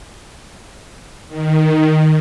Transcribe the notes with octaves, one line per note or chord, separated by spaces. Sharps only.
D#3